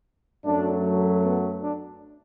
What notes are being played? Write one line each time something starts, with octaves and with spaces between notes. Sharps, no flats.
F#2 F#3 A3 D4
B3
D4